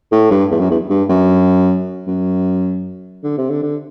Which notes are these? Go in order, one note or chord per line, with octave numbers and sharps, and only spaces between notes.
A2
G2
E2
F#2
E2
G2
F#2
F#2
D3
C3
D3
D3